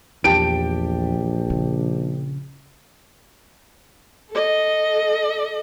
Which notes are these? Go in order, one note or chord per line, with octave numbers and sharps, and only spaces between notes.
A#1 E2 G4 G5 A5 D7
C#3
A4 D#5